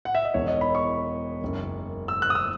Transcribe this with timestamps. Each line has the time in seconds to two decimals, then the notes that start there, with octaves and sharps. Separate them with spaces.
0.05 F#5
0.15 E5
0.25 D#5
0.34 E1 E2 D#3 C#5
0.48 D#5
0.61 B5
0.75 C#6
1.41 F#1 F#2 D#3
2.08 E6
2.22 F#6
2.30 D#6
2.35 E6